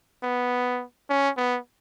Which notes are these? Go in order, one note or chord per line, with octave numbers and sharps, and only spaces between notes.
B3
C#4
B3